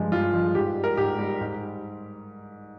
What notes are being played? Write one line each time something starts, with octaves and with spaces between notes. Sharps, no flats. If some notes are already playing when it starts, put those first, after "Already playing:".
Already playing: G2 F3 G#3
G2 F4
F3 G#3
G#2 G4
G3
A#4
G#2 G4
G3
G#2